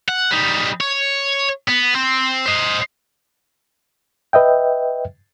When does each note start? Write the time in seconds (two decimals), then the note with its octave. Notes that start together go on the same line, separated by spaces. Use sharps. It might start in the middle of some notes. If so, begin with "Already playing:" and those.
0.08 F#5
0.31 G3 D#4
0.81 C#5
1.68 B3
1.95 C4
2.46 C5 D#5
4.33 B4 D#5 E5 G5